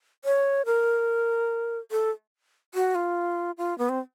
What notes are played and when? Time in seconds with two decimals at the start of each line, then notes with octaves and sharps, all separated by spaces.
0.25 C#5
0.66 A#4
1.91 A4
2.74 F#4
2.95 F4
3.58 F4
3.78 B3
3.89 C4